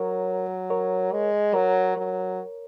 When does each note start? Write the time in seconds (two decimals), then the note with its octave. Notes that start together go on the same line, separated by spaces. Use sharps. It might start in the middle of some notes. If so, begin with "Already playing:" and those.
Already playing: F#3 A#4 C#5
0.70 A#4 C#5
1.12 G#3
1.54 F#3 A#4 C#5
1.97 F#3